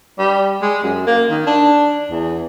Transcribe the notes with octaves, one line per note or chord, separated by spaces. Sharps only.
G3
G#3
F#2
A#3
D#3
D4
E2